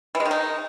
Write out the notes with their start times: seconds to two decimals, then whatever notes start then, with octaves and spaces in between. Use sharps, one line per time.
0.15 E3
0.20 G#3
0.25 D#3
0.31 D#4